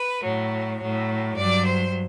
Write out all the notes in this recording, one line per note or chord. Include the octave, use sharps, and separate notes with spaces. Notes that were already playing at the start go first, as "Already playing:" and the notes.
Already playing: B4
A2 F#3
A2 F#3
G2 F#3 D5
C5